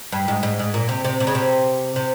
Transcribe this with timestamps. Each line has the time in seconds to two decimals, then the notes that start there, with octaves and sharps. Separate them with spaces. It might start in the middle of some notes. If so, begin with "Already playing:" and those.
0.12 G2
0.28 G#2
0.43 G#2
0.59 G#2
0.74 A#2
0.89 C3
1.04 C3
1.20 C3
1.27 C#3
1.35 C3
1.96 C3